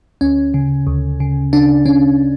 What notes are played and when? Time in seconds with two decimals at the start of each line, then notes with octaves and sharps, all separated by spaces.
0.21 D2 C#4
0.54 C#3
0.87 D2
1.20 C#3
1.53 C#3 D4
1.86 C#3 C#4